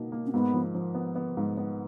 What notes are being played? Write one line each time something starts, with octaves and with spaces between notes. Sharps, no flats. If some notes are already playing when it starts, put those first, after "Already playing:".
Already playing: B2 A#3 D#4
A#3
C#4
G#2 B3
F3
F3
B3
B3
G#2
B3